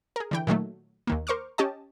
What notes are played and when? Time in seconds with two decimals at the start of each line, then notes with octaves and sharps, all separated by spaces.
0.16 G#4 A#4
0.31 D3 E3 G5
0.47 A#2 D#3 F#3 A3
1.07 D#2 D#3 A#3
1.27 A#4 C5 C#6 D6 F6
1.58 C#4 G4 D#5 A5